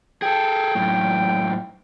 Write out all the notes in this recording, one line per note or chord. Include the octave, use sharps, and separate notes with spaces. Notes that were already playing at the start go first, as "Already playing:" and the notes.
G#4 A4 G5
F#2 A2